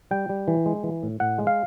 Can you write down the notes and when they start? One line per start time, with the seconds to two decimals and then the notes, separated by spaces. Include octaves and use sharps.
0.11 G3 G5
0.29 G3
0.48 E3
0.66 G#3
0.84 E3
1.03 A2
1.20 A2 F#5
1.38 G#3
1.47 F5